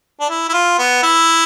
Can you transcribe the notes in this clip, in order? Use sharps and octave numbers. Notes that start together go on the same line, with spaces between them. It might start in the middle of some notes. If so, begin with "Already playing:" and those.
D4
E4
E4
F4
B3
E4